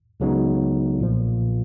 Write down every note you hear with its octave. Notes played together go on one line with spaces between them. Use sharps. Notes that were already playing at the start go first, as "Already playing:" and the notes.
C#2 C#3 F#3 B3 D#4
B1 A#2 F3